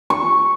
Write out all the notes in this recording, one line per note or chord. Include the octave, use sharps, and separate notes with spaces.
C#6